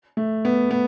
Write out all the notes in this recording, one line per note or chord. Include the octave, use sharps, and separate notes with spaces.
A3
B3
B3